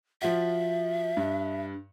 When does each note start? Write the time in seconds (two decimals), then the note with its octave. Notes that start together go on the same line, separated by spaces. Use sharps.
0.22 F3 F4 F#4 E5
1.17 G2